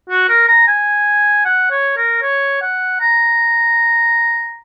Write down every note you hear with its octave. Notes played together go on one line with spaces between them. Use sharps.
F#4
A#4
A#5
G#5
F#5
C#5
A#4
C#5
F#5
A#5